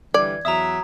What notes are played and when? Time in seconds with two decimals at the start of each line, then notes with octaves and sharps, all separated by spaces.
0.14 D3 E3 G3 D5 G#6
0.45 E2 F#3 E5 A#5 D#6